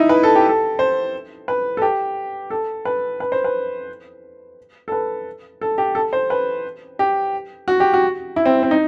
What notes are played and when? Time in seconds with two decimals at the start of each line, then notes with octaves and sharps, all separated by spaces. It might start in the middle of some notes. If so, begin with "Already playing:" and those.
Already playing: D#4 E4
0.09 B4
0.23 A4
0.35 G4
0.49 A4
0.79 C5
1.48 B4
1.77 A4
1.82 G4
2.50 A4
2.85 B4
3.20 B4
3.32 C5
3.44 B4
4.88 A4
4.92 B4
5.61 A4
5.78 G4
5.95 A4
6.13 C5
6.30 B4
6.99 G4
7.68 F#4
7.80 G4
7.94 F#4
8.36 E4
8.46 C4
8.63 C4
8.71 D#4